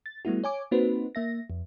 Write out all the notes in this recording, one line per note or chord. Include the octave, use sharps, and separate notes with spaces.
A6
G3 A3 B3 E4 F#4
C#5 G#5 D6
A#3 C4 D#4 F#4 B4 C5
A#3 E5 A#6
F2